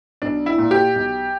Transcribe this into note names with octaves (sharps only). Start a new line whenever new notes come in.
B1 D4
E4
A#2
G4
B1